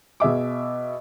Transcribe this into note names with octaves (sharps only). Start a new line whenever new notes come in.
B2 G#4 E5 D6